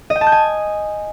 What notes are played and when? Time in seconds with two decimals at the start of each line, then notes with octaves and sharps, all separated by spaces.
0.10 D#5
0.16 G5
0.21 A5
0.27 G6
0.32 G#5